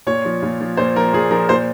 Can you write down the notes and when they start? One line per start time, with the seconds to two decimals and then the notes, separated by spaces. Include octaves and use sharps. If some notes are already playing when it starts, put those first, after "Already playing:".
0.07 A#2 C#5
0.25 F3
0.43 A#2
0.61 F3
0.77 A#2 C5
0.96 F3 A#4
1.13 A#2 G#4
1.31 F3 A#4
1.49 A#2 C5